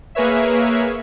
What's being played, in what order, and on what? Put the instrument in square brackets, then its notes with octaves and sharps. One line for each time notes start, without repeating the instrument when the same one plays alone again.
[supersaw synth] A#3 G#4 A#4 B4 C#5 E5